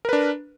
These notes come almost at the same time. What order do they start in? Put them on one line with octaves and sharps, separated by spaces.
A#4 B4 D4